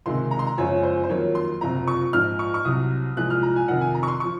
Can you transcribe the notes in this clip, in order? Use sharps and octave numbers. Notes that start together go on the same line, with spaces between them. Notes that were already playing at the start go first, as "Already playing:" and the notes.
C#2 C3 D#3 G#3 C6
A#5
C6
A#5
F#1 F#2 F3 G#3 C#5
C5
C5
F2 D#3 F#3 A#3 C#5
C6
F#1 F2 C3 F3 A#5
C#6
A#1 G#2 F3 F6
C#6
C#6
C2 C3 F#3 D#6
C2 A#2 F3 G#3 F#6
F6
A#5
G#5
F2 C3 D#3 F#5
G#5
A#5
C#6
C6
F3 C#6